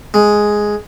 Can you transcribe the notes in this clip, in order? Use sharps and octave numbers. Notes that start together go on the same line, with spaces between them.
G#3